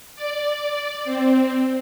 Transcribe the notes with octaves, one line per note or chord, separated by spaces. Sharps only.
D5
C4